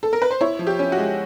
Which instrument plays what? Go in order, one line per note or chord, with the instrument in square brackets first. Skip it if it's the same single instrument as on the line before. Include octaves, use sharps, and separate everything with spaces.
[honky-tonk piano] A4
A#4
B4
C5
E4 C#5
F3
G4
C#4
F#4
G#3